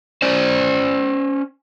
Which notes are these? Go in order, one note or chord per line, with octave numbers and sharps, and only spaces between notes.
C#4 C5 D5